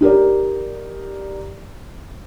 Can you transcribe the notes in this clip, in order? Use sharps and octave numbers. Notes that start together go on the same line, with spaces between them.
D#4 G4 A#4 D5